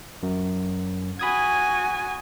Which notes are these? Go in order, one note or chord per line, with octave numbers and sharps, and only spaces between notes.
F#2
F#4 G#5 B5 D#6 G#6